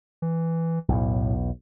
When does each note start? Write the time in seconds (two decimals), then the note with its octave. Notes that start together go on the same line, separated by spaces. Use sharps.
0.22 E3
0.89 B1 E2 A2